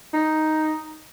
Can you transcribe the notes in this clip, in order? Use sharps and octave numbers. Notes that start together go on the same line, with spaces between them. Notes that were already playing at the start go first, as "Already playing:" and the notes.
D#4